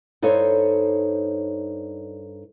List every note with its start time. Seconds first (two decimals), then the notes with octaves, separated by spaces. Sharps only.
0.22 G2 D#4 A4 C5 C#5